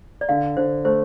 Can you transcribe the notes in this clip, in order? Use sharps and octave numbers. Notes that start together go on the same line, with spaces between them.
D5
D3 F5
D3 C5
A3 C5